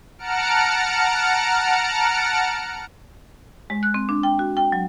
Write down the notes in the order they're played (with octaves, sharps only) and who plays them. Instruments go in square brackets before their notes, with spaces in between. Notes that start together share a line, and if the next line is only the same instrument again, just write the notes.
[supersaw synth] F#5 A5 A#5 F6 C#7 D7
[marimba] G#3
F#6
C4
D4
G5
F#4
G5
F#3